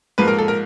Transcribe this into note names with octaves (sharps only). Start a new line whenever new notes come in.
G#2 F3 A#3 B4
A#4
A4
A#4